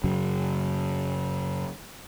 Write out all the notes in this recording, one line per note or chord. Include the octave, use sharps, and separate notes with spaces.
F#2 C#3 F#3